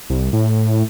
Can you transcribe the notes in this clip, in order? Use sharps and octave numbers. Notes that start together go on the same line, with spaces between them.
C2
A2